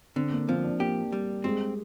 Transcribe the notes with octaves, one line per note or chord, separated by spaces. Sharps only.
D3 C4
A#3
F3 C4
D4
A#3 G4
G3
G#3 C4